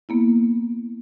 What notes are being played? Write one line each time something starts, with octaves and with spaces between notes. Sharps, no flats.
A#3 B3 E4